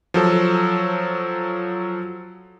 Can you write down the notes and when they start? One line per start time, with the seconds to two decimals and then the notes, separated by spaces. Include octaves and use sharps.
0.14 F3 F#3 A4